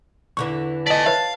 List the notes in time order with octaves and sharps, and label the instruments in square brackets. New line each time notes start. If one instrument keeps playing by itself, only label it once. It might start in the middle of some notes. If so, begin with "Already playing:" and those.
[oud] E2 D3 E3 [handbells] C#6
[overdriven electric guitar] D5 G#5 [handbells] D#5 B6 [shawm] A5
[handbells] B4 C#5 E5 [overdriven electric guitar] F5